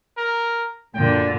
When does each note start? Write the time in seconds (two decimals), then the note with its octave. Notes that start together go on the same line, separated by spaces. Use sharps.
0.18 A#4
0.95 F#2 A#2 D3 G5